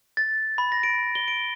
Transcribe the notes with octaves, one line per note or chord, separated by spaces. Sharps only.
A6
B5
A#6
D7
G7
D7